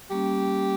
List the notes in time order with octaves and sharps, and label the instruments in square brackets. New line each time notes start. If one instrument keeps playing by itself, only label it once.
[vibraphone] G3 A#3 C#4 [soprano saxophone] G4